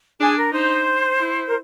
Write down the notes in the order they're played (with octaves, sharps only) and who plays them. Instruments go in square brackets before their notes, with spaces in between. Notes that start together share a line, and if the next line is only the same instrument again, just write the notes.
[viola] D4 [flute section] G#4
[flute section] A#4
[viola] D#4 [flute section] C5
[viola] E4
[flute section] A#4